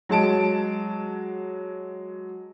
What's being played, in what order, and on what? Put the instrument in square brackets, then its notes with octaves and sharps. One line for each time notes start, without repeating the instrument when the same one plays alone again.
[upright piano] F#3 G#3 A5 D7